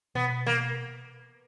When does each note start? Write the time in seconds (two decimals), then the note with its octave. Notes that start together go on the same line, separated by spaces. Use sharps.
0.15 B2 B3
0.46 A#3